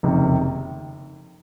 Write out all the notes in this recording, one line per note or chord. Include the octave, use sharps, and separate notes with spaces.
F#1 F2 C3 D#3